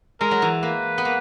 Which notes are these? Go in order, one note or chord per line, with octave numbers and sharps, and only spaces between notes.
G#3 A#4
F#3
E3
A#3 B4
B3
A#3